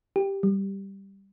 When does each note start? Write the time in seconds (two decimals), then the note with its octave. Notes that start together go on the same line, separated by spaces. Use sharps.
0.16 G4
0.43 G3